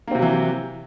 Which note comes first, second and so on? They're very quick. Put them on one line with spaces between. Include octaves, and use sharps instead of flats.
A#3 C4 C3 F#3 E3